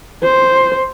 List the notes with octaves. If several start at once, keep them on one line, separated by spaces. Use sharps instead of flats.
C5